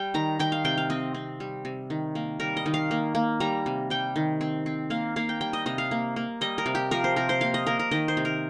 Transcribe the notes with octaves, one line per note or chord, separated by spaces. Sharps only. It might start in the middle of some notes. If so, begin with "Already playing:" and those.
Already playing: G3 G5
D#3 A#5
D#3 G5
F5
C3 G5
F5
C4 D#5
C4
G3
C3
D#3
A#3
G3 A#4
D#5
D#3
F5
A#3
A#3
G3 A#5
C3
G3 G5
D#3
C4
C4
A#3 F5
A#3 F5
G5
G3 G5
D#5
C3 D#5
F5
A#3
A#3
G3 D#5
A#4
C3
G4
F3 A#4
C5
C3 A#4
C5
A#3 F5
D#5
A#3 A#4
A#4
D#3 D#5
C5
C3
A#4